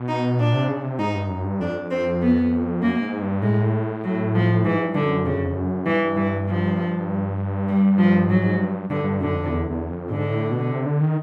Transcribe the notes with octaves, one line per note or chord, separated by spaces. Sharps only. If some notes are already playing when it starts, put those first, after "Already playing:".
Already playing: B2
D#4
A#2 D4
C3
C#3
C3
G#2 D#4
G2
F#2
G2
F2 D4
C4
B3
F#2 A#3
G#2
G2
A2 G#3
F#3
F3
G#2 E3
G2
D3
F#2
F2 C#3
F#2
F2
F#2
G2 E3
E3
F3
G3
F3
G#2 F#3
G2
G2 D3
G2
F#2 D3
F2
E2
E2
F2
G#2 D3
A2
B2
C3
D3
D#3